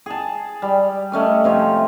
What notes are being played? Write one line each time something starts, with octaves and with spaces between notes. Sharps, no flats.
G#4 A5
G3
A3 C#4 D#5
C3 F3 C#5